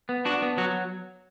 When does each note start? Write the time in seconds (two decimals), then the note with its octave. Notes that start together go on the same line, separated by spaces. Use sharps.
0.09 B3
0.25 D4 F#4
0.42 B3
0.58 F#3 F#4